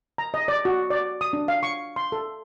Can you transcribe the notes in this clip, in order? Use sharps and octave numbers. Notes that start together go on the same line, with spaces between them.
A#5
D#5
D5
F#4
D5
D#6
D4
F5
C#6
C6
A4